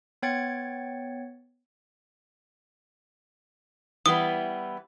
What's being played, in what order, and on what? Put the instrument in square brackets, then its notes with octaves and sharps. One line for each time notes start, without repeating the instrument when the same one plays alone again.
[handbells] B3 C#5 G5 G#6 A6 C#7
[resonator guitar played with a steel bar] E3 G3 B3 [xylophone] D#6